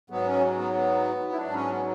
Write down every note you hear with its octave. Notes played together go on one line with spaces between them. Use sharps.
G#2 F#3 B3
C#4
B3
B3
E4
G#2 F#3 D4
C#4
B3